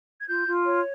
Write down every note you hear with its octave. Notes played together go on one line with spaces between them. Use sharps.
G#6
F4 G6
F4
C#5